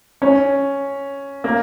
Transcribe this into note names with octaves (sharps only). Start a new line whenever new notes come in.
C#4
A#3